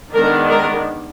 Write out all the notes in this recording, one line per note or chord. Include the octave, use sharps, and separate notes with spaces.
D#3 G#3 B3 D4 A#4
A#4